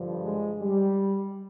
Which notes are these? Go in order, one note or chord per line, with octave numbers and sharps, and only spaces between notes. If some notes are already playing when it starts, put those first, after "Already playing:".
Already playing: G2 D3 F3
G#3
G3